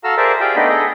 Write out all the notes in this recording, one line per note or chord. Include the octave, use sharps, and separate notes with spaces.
F#4 A4 F5 A#5 E6 F6
G#4 A#4 C5 D5 E5 A5
F4 G4 G#4 D5 G5
A3 B3 D4 D#4 D#5 B5
G#4 A4 D#5